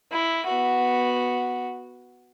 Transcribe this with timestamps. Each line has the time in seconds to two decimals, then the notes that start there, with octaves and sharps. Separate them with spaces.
0.12 E4
0.47 B3 F#4